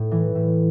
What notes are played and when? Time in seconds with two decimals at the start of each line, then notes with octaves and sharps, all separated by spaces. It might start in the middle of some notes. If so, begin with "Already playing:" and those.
Already playing: A2
0.11 E3
0.35 A2